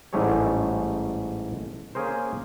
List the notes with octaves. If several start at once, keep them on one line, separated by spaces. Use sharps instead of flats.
A1 G#2 G3 A3 G#4 C#5
A#3 C#4 G#4 A#4 C5